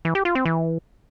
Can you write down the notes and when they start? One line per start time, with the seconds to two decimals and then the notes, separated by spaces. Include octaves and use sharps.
0.05 E3
0.15 G4
0.25 F4
0.35 C4
0.45 E3